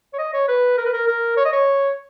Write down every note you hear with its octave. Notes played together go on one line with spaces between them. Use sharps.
C#5
D#5
C#5
B4
A#4
B4
A#4
A#4
C#5
D#5
C#5